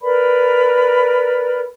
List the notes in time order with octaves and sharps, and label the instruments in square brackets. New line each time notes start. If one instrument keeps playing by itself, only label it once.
[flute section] A#4 B4 D5 B5